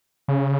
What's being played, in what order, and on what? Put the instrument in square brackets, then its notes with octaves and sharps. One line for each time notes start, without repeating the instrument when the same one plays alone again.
[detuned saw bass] C#3